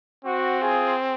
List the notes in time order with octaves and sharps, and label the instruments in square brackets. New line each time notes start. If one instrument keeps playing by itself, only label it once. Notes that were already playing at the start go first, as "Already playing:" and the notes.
[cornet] C4 [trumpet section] F#4
[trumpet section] F4 G#4